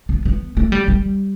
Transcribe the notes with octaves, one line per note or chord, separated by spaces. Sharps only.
B3
B3
A3
G3
G3